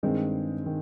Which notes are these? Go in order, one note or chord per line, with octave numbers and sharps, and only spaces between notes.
G2 D#3 G#3 C4
D#3